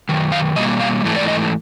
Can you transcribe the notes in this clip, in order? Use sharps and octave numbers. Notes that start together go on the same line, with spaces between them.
F#2 D#3
F5
B2 G3 A#3 D#5
F5
G#2 E3 A3
D5
D#5